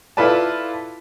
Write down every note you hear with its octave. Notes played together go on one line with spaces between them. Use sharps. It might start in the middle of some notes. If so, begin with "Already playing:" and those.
E4 F4 A4 B4 D5 A5